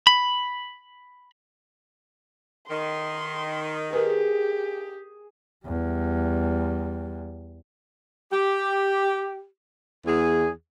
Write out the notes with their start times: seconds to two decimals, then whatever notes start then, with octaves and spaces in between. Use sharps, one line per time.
0.07 B5
2.70 D#3 C6
3.93 G4 G#4 A#4 B4
5.66 E2 G3
8.31 G4
10.06 E2 G#4